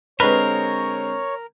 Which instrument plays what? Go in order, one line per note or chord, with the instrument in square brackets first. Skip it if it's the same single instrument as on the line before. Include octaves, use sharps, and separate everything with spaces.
[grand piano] D3 G#3 C4 [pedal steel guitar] A#4 [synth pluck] B4 [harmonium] C#5